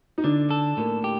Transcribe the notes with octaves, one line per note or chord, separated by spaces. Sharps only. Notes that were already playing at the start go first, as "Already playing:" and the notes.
D#4
D3 D4
A4
A2 A#3
G4